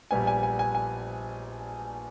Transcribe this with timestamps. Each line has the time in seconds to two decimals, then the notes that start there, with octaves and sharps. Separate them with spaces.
0.11 A#1 A#2 G3 B3 G#5
0.27 G#5
0.43 G#5
0.59 G#5
0.75 G#5